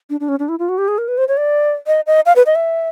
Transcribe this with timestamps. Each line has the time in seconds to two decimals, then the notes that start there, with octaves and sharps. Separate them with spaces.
0.10 D4
0.20 D4
0.29 C#4
0.39 D4
0.49 E4
0.59 F4
0.69 F#4
0.78 G4
0.88 G#4
0.98 A#4
1.08 B4
1.18 C5
1.28 C#5
1.37 D5
1.87 D#5
2.07 D#5
2.26 F5
2.36 B4
2.46 D#5
2.55 E5